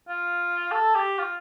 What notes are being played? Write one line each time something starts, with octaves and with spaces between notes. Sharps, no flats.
F4
A4
G4
F4